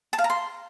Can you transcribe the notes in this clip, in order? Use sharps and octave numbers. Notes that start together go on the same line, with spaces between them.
A5
F5
A#5
C6